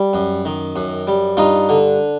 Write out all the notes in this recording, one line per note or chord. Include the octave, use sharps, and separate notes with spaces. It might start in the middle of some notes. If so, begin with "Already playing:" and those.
Already playing: G3
F#2
D#3
F#2
G3
G2 D#4 F4
D3